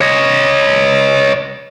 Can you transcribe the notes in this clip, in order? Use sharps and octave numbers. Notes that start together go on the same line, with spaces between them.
C#5 D#5